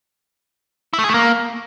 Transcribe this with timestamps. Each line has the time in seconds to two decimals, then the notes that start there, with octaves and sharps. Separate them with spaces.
0.93 E4
0.99 A3
1.04 G#4
1.09 A3
1.14 A#3